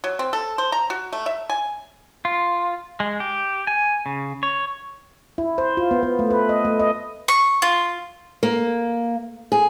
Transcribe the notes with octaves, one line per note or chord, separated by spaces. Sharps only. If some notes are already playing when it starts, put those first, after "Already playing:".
F#3
C4
A4
C5
A#5
F#4
A3
E5
G#5
F4
G#3
G4
G#5
C#3
C#5
E4
C5
F4
B3
B3
A3
B4
D#5
A3
D#5
C#6
F4
A#3
G#4